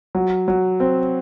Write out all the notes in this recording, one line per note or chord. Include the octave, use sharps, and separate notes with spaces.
F#3
F#3
C4